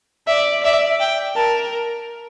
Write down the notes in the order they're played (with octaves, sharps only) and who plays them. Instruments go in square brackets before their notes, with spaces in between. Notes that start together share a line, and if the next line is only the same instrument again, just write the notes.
[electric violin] D5 [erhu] E5
[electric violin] D5 [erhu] E5
[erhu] G5
[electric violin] A#4 [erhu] A5